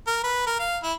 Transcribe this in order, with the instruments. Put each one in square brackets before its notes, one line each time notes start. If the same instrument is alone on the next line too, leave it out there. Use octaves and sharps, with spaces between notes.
[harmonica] A#4
B4
A#4
F5
E4